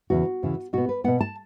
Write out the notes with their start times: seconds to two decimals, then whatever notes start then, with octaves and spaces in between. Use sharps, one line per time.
0.10 E2 C#3 E3 F#4
0.43 E2 C#3 E3
0.73 B2 B3 F#4
0.89 B4
1.04 B2 B3 F#5
1.21 A5